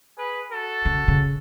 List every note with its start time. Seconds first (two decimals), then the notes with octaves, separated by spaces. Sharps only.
0.16 G#4 B4
0.50 F#4 A4
0.85 C#3
1.08 C#3